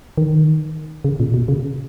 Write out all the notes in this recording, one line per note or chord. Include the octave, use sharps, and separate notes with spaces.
D#3
C#3
A#2
B2
C#3